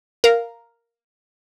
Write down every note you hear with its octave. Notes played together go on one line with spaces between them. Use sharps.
A#4 F5